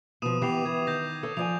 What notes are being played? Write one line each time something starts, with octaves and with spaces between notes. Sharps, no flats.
B2 F3 D#6 D#7 E7
E3 B3 G4 D6 C7 F7
E3 G#6
D#3 G6 A#6
A4 C#5
F3 D5 G#5 F7